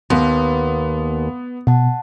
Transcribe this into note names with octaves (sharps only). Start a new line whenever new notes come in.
D#2 B3 B4 F5 C6
B2 F#5 A5